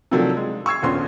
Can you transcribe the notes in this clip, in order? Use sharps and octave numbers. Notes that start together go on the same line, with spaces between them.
C3 D#3 F3 F#3 A3 D4
G#3
C#6 E6 G#6 C7
D#1 A#1 B3 C#4 C6